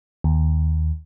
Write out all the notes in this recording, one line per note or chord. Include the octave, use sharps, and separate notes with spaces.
D#2